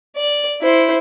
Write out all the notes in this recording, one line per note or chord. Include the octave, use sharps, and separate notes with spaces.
D5
E4 C5